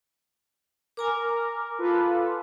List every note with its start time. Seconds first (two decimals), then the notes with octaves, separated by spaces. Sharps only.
0.97 A#4 G#5 A#5 D6
1.78 F4 A4 B4